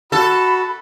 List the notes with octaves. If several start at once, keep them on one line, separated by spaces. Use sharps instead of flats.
F#4 A4 B5